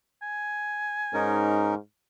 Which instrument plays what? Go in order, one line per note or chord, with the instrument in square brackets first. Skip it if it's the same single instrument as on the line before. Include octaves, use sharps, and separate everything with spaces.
[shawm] G#5
[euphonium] G#2 [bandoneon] C#4 D#4 A#4